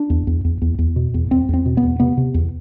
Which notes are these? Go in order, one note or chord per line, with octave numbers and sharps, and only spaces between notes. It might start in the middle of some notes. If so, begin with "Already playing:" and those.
Already playing: D4
E2
E2
E2
E2
E2
B2
E2
E2 C4
E2 C4
B2
B3
E2
C3 B3
C3
E2